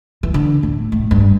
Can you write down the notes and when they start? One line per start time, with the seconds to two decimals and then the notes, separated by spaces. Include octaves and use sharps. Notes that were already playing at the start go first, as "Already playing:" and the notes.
0.23 E3
0.34 D3
0.63 A2
0.92 A2
1.11 G2